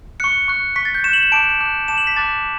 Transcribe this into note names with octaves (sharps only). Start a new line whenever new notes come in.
C#6 F#6 C#7
C#6 F#6
C#6 F#6 B6
A6
G6
C#6 F#6 E7
F#7
E7
A5 D6 F#6 D7
A5 D6 F#6
A5 D6 F#6 E7
F#7
B6
A5 D6 F#6 A6